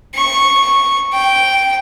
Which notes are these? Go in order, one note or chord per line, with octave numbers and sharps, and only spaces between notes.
C#6
G5